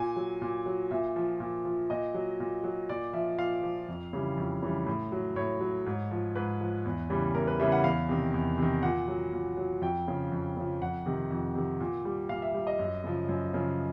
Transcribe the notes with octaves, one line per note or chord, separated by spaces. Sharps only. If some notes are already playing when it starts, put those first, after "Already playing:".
Already playing: A#2 G#5
F#3
A#2
F#3
A#2 E5
F3
A#2
F3
A#2 D#5
F#3
A#2
F#3
A#2 D5
F3 E5
A#2 F5
F3
F2
C#3 E3 G3
F2
C#3 E3 G3
A2
F#3
A2 C#5
F#3
G#2
F3
G#2 B4
F3
E2
C#3 E3 G3
E2 A#4
B4
C#3 E3 G3 E5
F#5
E2 F5
C3 D#3
E2
C3 D#3
A#2 F#5
F#3
A#2
F#3
F2 G5
C#3 F3
F2
C#3 F3
F2 F#5
C3 D#3
F2
C3 D#3
A#2
G3
A#2 F5
E5
G3
D#5
F#2
C#3 F3
F#2
C#3 F3